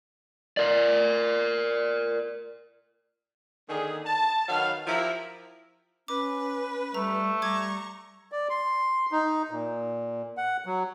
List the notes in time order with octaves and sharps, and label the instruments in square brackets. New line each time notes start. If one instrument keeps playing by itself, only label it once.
[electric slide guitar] A#4 D5
[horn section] D3 D#3 A#3 G#4
A5
D#3 F#3 B4 F5
F3 E4 G4 A#4
[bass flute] C#4 [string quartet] B4 [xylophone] D6
[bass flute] G3 [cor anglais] A3 [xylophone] A#5
[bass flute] G3 [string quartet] A#5 C#6 [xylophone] D6 G#6
[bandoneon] D5
C6
D#4
A#2
F#5
F#3